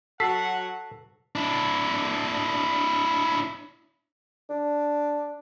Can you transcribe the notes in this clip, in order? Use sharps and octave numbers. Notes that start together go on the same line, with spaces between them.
F#3 F#4 A4 F#5 B6 C7
D4 E4
D4